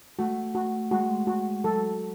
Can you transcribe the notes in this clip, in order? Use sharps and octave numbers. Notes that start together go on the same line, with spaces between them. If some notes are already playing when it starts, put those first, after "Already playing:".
A3 F#4
F#4
G#3 F#4
F#4
F#3 A4